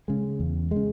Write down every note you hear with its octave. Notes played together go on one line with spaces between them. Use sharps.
C#3 G#3
E2
C#3 G#3